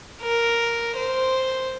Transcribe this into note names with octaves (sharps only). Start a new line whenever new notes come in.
A#4
C5